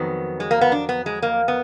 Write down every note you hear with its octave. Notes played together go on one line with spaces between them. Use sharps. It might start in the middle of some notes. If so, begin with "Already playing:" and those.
Already playing: F2 D#3 F#3 B3
G#3
A#3
B3
D4
B3
G#3
A#3
B3